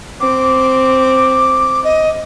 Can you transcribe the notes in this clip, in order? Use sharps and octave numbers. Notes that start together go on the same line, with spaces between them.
C4 D6
D#5